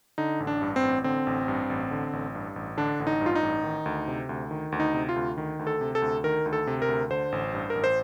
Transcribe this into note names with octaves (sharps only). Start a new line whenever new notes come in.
D3 D#4
A1
D4
G2
C4
A1
D3 C4
A1
G2
A1
D3
A1
G2
A1
D3 D4
A1
D#4
G2
F4
D#4
A1
D#3
D2
C3
D2
D#3
D2
D#4
C3
F4
D2
D#3
D2
A4
C3
A4
D2
D#3 A#4
D2
A4
C3
A#4
D2
D3 C5
A1
G2
A#4
A1
C5